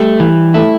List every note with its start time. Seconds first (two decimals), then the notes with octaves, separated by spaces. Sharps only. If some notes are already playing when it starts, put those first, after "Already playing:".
Already playing: G3 A3 G4
0.20 E3
0.54 A3 E4 A4